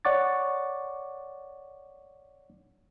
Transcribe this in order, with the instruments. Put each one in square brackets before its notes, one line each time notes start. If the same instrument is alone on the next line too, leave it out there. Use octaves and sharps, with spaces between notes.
[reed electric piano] C#5 D5 F#5 C#6 D6 A6